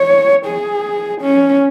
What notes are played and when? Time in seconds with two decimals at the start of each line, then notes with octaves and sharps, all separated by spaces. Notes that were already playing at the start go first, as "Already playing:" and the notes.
Already playing: C#5
0.47 G#4
1.22 C#4